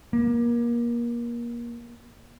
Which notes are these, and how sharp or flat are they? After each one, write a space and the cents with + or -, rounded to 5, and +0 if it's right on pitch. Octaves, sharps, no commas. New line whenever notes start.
A#3 +30